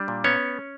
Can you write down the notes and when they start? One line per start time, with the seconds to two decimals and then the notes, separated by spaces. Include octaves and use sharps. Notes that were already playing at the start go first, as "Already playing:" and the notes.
Already playing: G3 D4
0.08 A#2
0.24 B3 C#4 C#5